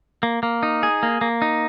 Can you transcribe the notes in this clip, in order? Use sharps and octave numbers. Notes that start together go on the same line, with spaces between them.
A#3
A#3
D#4
G#4
A#3
A#3
D#4